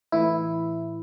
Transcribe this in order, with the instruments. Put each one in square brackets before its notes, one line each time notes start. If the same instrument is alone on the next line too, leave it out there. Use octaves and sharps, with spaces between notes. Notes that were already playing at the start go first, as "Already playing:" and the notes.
[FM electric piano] A2 E3 E4